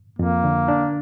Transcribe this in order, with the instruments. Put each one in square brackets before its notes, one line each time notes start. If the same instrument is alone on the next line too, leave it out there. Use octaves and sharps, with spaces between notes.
[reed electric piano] F2 [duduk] A#3
[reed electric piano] D3
D4